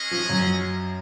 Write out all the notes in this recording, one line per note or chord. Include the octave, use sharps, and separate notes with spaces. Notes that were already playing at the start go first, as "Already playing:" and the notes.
Already playing: G#3 C#4 G#4 D#5
F3
F#2 F#3